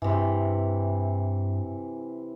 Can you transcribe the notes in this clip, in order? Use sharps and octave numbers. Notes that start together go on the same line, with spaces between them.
G2 C3 E3